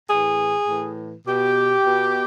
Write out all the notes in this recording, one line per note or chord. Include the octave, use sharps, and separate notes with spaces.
A2 E3 G#4
A2 E3
B2 G4
B2